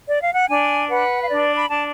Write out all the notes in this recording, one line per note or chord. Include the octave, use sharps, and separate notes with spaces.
D5
F5
F#5
D4 G#5
B4 F#5
F5
D4 D5
B5
D4 A5